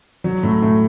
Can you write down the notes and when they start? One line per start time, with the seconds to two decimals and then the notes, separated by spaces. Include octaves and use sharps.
0.24 F#3
0.43 A2
0.62 A2